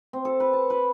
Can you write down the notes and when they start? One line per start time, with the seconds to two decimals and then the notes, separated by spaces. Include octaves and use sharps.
0.13 C4
0.25 A4
0.40 B4
0.53 A5
0.70 B4